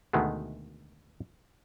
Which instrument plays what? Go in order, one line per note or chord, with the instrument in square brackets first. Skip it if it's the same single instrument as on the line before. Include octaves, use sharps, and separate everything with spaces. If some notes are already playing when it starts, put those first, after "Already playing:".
[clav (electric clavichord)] D2 B2 D#3 G#3 A3 B3